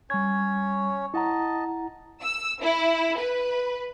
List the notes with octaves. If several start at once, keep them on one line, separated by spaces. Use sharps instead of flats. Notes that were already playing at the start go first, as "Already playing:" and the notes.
G3 C#4 C#5 G#6
E4 D#5 F#5 A5 A#5
E6
E4
B4